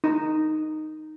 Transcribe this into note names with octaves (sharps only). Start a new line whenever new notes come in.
D#4